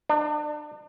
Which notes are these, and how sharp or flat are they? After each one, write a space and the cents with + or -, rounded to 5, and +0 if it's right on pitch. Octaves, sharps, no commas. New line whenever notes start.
D4 +35